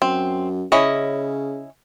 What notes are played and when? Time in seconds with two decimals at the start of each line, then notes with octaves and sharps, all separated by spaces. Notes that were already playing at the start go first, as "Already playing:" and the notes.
0.02 F#2 C4
0.72 C#3 C#4 E4 D#5